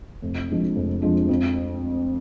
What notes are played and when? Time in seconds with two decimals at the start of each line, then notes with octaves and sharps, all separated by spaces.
0.22 F1
0.49 F2 F3 G#3 D4
0.76 F1
1.02 F2 F3 G#3 D4
1.29 F2